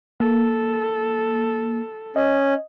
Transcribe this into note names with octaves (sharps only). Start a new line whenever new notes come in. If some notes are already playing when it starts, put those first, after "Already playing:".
A#3 A4
C#4 D#5